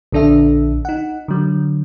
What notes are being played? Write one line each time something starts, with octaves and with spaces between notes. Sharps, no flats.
A#1 D3 D4 A4 E5
D#4 F#5
D3 F#3